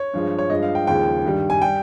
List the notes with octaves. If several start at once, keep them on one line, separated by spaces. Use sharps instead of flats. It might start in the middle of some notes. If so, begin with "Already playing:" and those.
Already playing: C#5
G2 F3 G#3
C#5
G2 F3 G#3 D#5
F5
G5
D#2 C#3 F3 G#3 G5
G2 D#3 G3
G#5
G3 G5